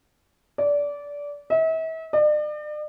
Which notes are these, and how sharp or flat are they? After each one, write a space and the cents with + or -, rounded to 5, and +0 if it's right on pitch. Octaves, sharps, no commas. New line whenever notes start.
D5 -20
E5 -40
D5 +40